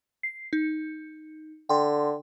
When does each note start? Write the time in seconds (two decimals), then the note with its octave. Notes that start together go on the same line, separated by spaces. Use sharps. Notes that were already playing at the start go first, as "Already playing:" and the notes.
0.23 C7
0.53 D#4
1.69 D3 G5 C6